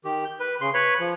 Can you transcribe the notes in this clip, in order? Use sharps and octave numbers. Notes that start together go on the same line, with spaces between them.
D#3 G4
G6
B4
C#3 C6
B4 C#5 B5
F3